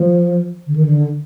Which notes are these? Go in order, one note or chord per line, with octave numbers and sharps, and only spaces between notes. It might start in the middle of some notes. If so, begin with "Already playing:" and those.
Already playing: F3
D3
D#3
D3